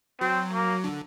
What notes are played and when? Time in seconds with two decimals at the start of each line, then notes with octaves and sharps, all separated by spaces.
0.21 F#3 C4
0.53 A#3
0.84 D3